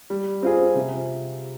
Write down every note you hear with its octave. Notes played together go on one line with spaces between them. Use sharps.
G3
C4 F4 G#4
C3